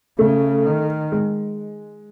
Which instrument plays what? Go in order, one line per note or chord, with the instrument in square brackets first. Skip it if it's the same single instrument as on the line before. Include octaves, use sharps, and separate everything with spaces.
[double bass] C#3 [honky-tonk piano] A3
[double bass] D#3
[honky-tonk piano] G#3